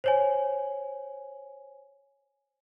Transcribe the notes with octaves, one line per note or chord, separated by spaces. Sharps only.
C5 C#5 G#5